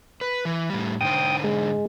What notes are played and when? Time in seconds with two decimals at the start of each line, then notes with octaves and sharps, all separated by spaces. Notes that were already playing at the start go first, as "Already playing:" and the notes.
0.21 B4
0.45 E3
0.70 A2 G3
1.01 G#2 D3 C5 G5 D#6
1.44 G#3